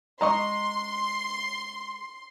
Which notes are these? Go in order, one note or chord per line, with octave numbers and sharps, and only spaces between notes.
G#3 D#5 A#5 C6 C#6